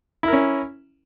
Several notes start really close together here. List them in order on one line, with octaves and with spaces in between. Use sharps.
E4 A#4 C#4